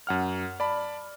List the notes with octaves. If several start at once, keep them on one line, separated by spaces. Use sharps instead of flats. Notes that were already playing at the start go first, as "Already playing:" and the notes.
F#2 F#5 F6
D5 A5 B5